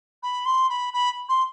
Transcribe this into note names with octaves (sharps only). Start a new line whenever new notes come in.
B5
C6
B5
B5
C6